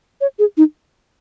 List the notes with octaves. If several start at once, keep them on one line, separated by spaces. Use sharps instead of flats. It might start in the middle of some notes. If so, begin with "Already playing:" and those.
C#5
G#4
D#4